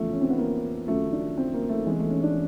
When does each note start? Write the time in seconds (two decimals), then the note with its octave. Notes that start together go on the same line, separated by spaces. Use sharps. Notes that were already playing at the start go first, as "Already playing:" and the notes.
Already playing: F1 E2 C#3 F3 A3
0.13 C#4
0.21 C4
0.30 B3
0.39 A#3
0.87 G#1 F#2 C#3 F3 A3
1.13 D4
1.38 C4
1.54 A#3
1.69 A3
1.86 E1 E2 C3 E3 G#3
1.99 A3
2.10 C#4
2.23 D4